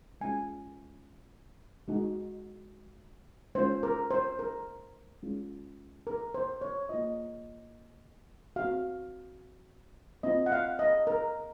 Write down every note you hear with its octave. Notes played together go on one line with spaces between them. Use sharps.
G#3 C#4 F4 G#5
G#3 D#4 F#4
G#3 C#4 F4 C5
A#4
C5
A#4
G#3 C#4 F4
A#4
C5
C#5
A#3 F4 D#5
C4 F#4 F5
C4 F4 D#5
F#5
F5
D#5
A#4